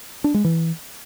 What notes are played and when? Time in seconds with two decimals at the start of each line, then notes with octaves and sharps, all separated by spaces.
0.24 D4
0.34 G#3
0.44 E3